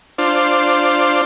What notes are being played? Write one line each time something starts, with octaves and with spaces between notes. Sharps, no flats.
D4 F4 C5